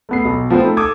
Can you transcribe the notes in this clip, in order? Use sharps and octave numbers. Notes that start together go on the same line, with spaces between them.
A3 B3 C7
B1
F3 A3 B3 C4
A3 D#4
A4 D6 D#6 G#6